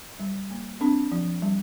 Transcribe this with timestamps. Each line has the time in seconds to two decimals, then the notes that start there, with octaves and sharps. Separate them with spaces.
0.20 G3
0.50 A#3
0.81 C4 D4
1.12 F3
1.42 G3